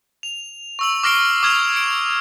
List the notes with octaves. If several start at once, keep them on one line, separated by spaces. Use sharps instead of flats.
F7
C#6 E6 F#7
D6 F6 A#6 C7 D7 G7
D6 D#6 F6 G#6 F7 G7
D7